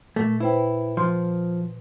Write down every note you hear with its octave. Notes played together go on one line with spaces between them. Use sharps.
A#2 A3
E4 B4 C5 G5
F3 C6